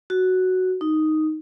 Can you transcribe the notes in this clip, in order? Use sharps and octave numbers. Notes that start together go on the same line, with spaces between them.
F#4
D#4